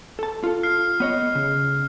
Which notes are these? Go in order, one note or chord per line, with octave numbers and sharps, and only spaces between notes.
A4 A5
F4 A4
F6 C7
B3 C#5 D#5
C#3